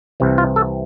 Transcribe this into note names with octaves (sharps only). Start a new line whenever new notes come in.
C2 C3 E3
F4
A4